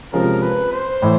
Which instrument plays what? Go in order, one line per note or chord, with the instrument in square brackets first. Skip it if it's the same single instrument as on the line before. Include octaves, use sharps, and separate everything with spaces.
[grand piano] C3 F3 G#3 C#4 [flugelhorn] A#4
[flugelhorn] B4
C5
[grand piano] A2 E3 A3